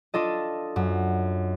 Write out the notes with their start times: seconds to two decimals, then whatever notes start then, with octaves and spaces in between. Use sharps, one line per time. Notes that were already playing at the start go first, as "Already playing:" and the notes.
0.14 D4 F4 A4 D#5
0.76 F#2